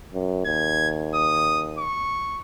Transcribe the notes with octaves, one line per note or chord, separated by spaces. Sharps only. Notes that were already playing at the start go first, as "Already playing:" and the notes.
F#2
D#2 G#6
D#6
C#6